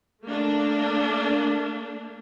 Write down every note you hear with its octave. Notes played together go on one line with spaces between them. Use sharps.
A3 A#3 D4